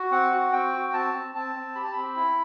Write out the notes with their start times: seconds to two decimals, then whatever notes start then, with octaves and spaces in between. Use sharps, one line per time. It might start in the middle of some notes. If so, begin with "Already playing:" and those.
Already playing: F#4
0.11 C4 F#5
0.31 F#4
0.52 C4 G5
0.73 F#4
0.94 C4 A5
1.14 C4
1.34 C4 A5
1.56 C4
1.75 G4 B5
1.84 A5
1.92 C4 B5
2.16 E4